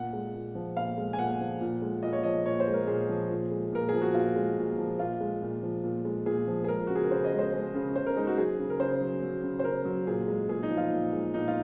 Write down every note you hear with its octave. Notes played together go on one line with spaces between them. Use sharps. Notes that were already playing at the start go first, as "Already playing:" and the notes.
Already playing: A#2 F#5
G#3
A#2
F3
A#2 F5
G#3
G#5
A#2 F#5
F3
A#2
G#3
A#2 D#5
C#5
F3 D#5
A#2 C#5
C5
G#3
A#4
A#2 G#4
F3
A#2
G#3
A#2 A#4
F3 G#4
F#4
A#2 F4
G#3
A#2
F3
A#2 F4
G#3
A#2
F3
A#2
G#3
A#2 G#4
F3
G#4
G#3 A#4
C#3 F#4
G#4
A#4
C#3 C5
D#5
G#3
C5
G#3
C#3
C#3 C5
A#4
G#3 D#4
F#4
F#3 G#4
C#3
A#4
C#3 C5
F#3
F#3
C#3
C5
C#3 A#4
F#3
A#2 G#4
G#3
A#2 G#4
D#4
F3
F4
A#2
G#3
A#2 D#4
F4